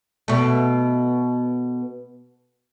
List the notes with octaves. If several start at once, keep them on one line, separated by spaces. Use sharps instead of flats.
B2 A3